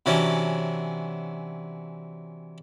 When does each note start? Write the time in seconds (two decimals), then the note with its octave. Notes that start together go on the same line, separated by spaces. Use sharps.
0.06 C3 E3 F#3 C#4 D4